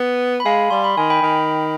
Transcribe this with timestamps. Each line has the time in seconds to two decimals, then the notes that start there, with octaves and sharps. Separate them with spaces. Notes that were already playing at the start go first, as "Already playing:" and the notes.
Already playing: B3
0.40 B5
0.45 G#3 F5 G#5
0.70 G3 C6
0.84 B5
0.97 D#3 G#5
1.10 G5 B5
1.22 D#3